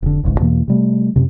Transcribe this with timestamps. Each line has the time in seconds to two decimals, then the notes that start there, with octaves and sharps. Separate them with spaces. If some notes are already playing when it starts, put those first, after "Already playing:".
0.02 F1 D3
0.23 D#1 G#1 C#2 G#2
0.40 E2 B2 E3 A#3
0.68 C3 G3 A3
1.16 F#2 C3